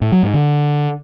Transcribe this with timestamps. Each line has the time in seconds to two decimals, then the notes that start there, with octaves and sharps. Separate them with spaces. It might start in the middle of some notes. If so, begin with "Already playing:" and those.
0.01 A2
0.12 F#3
0.23 G#2
0.34 D3